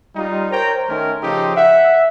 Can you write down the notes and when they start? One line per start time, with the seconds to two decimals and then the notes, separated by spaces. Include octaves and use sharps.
0.16 G3 D#4 F4
0.52 A#4 C5 C#5 G5 A#5
0.89 D#3 A3 C#4 A#4 C5
1.23 C#3 F3 D#4 G4 A4 C5
1.56 E5 F#5